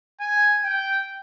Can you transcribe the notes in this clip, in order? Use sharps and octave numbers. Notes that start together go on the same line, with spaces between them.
G#5
G5